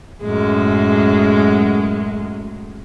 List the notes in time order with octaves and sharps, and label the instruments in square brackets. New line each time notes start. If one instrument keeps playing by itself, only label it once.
[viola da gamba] F#2 A2 G#3